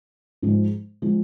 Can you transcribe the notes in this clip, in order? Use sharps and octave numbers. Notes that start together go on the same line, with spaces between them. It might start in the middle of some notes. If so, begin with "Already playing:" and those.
G#2 F3 G#3
F3 G#3